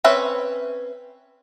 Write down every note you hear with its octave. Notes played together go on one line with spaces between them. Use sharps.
C4 C#4 B4 E5